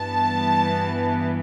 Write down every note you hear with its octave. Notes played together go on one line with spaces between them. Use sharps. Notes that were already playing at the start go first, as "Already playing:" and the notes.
Already playing: G2 E3 B3 A5